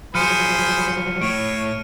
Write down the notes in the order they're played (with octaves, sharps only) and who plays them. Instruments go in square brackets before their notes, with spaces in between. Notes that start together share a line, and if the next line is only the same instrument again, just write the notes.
[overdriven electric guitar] F3 F#3 [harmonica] G#4 C5 B5 [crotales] F6 C#7 D#7
[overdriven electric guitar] A2 [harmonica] C#5 [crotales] D7